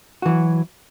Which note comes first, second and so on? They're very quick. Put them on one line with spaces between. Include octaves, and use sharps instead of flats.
F#4 E3 F#3